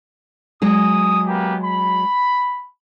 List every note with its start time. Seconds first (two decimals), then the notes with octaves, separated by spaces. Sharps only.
0.62 F#3 G#3 G#4 D#6
1.25 A#3 B3 G4
1.62 B5